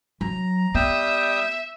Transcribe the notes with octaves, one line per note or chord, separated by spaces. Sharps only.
F#3 A#5
G3 B3 E5 G5 D#6